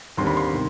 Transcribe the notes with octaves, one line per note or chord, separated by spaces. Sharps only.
D#2 D3 G3 C4 C6
B5
C6
C3 D#3